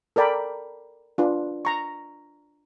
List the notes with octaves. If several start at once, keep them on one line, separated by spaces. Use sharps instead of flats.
A4 A#4 D5 G5 B5
D4 F4 B4
A#5 C#6